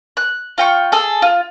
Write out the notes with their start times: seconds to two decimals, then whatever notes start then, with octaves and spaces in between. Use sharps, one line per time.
0.17 F#6
0.58 F4 G5 C#6
0.92 G#4 A4
1.22 F4